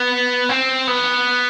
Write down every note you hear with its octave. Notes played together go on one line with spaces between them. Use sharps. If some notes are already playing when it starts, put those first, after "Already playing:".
Already playing: B3
C4
B3